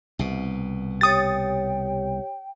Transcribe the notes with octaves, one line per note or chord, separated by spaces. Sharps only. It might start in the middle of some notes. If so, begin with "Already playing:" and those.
C2 B2
G4 C#5 G5 D#6 A6